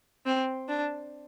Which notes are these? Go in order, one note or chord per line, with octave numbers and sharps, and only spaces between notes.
C4
D4